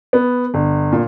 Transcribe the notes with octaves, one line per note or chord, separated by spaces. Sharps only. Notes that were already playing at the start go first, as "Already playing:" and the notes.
B3
G1
A#2